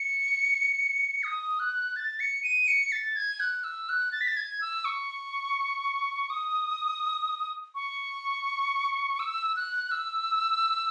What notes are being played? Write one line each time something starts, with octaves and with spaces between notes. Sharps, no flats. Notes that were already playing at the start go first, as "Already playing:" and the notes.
Already playing: C#7
D#6
F#6
A6
C#7
D#7
C#7
A6
G#6
F#6
E6
F#6
A6
B6
A6
G#6
E6
C#6
D#6
C#6
E6
F#6
E6